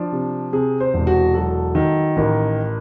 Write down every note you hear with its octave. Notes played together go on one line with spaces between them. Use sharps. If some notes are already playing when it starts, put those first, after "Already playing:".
Already playing: F3 D4
C3
C3 G#4
C5
E1
F#4
F#3 A4
D#3
A1 A#4